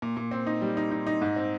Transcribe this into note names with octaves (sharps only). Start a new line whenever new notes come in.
A#2
A#2
C4
D#4
G3
D#4
D#4
D#4
G#2
C4